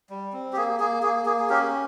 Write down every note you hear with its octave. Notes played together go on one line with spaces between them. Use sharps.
G3
C4
G4
A#3 G#4
A#3 G#4
A#3 G#4
A#3 G#4
G#4
C#4 G4 A#4